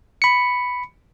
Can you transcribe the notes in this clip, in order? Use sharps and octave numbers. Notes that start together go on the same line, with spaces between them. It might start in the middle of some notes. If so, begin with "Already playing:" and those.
B5 C#7